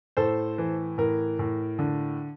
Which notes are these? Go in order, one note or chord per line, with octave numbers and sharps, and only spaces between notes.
A2 A4 C5
E3
A2 A#4
A2
D3